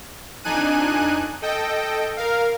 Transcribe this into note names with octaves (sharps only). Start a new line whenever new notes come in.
F2 D4 D#4 G#5 F#6 D#7
A4 D#5 G5
A#4 F5